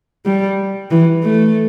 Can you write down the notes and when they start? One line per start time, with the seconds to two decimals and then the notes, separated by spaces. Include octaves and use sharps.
0.25 G3
0.91 E3
1.23 A3